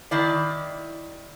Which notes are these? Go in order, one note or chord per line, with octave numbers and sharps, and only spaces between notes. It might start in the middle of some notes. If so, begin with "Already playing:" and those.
D#3 E4 D5